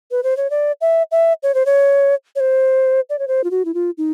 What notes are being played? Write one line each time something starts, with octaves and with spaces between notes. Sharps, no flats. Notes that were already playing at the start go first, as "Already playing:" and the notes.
B4
C5
C#5
D5
E5
E5
C#5
C5
C#5
C#5
C5
D5
C#5
C5
F4
F#4
E4
F4
D#4